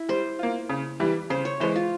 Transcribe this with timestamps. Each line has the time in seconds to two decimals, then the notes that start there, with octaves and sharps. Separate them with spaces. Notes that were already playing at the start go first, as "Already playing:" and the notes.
Already playing: E4
0.09 G3 C5
0.39 A#3 F4
0.69 C#3
1.00 E3 G3
1.30 C#3 C5
1.45 C#5
1.60 E3 G#3 C5
1.76 F4